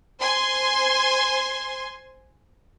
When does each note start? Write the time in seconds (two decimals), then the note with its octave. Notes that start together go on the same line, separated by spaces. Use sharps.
0.19 C5 G#5 C6